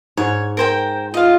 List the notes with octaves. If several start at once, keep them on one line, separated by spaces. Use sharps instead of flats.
G#2 C#5
A#4 C5 G5
F4 D#5 F5